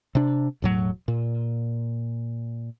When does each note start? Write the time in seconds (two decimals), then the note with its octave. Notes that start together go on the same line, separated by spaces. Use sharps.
0.15 C3 D4
0.62 E1 A2 F#3
1.08 A#2